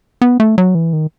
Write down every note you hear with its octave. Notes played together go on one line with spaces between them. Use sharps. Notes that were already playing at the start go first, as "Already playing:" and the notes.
B3
A3
F#3
E3
D#3